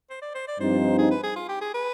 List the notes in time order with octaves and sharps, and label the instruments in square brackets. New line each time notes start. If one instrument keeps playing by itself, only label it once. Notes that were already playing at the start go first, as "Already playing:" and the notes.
[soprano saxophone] C5
D5
C5
D5
[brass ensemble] G2 F3 C4 D#4 [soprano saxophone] C5
[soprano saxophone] G#4
B4
G#4
F4
G4
G#4
B4